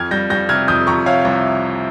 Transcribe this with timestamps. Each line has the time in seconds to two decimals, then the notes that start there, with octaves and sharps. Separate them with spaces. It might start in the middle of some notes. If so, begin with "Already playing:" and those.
Already playing: F2 F6 G#6
0.11 G3 G6 A#6
0.30 G3 G6 A#6
0.49 C3 F6 G#6
0.68 F2 D#6 G6
0.87 F2 A#5 C#6
1.06 C3 C#5 F5
1.25 C2